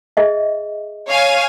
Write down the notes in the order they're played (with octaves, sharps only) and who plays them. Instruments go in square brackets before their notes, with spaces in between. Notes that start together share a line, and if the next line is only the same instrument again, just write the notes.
[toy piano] G#4 D#5 E5
[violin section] C#5 F5 G#5